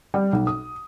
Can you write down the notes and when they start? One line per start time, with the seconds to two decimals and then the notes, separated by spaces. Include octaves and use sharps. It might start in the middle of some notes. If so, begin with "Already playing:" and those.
0.14 G3
0.33 B1
0.47 D#6